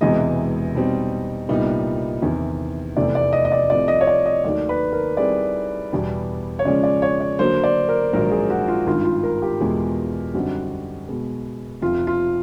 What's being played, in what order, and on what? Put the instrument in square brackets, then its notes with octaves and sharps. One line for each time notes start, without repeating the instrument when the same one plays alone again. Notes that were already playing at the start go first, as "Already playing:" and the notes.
[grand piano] E1 E2 C3 E3 G#3 [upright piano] D#5
[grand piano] B2 G3 C4 D#4
C2 A#2 G3 B3 D#4
E2 C3 D#3
[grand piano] F1 E2 C3 E3 A3 [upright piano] D5
[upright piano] D5
D#5
D#5
D5
[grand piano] C2 C3 F3 A3 [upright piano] D5
[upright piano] D#5
C#5
D5
D#5
[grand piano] D#2 D#3 F#3 A3 [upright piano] D5
[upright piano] B4
A#4
[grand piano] D#3 G3 C4 E4 G#4 [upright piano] D5
[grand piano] E2 B2 G3 B3
[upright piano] C#5
[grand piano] C#3 F3 G#3 C#4 [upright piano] D5
[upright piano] D5
C#5
D5
[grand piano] D3 F#3 A#3 [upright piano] C5
[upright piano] D5
A#4
[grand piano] A#1 G#2 D#3 F#3 [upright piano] A#4
[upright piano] G#4
F#4
F4
[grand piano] G#1 G2 D#3 [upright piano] F4
[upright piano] F4
A#4
G4
[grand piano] E2 B2 G#3
[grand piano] F#2 D3 G3 C4 D#4 [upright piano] F#4
[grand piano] B2 G#3 B3
[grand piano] F1 F2 C3 [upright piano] F4
[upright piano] F4